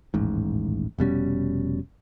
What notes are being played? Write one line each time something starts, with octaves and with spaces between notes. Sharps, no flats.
D#1 A1 G#2
F1 B2 G3 C#4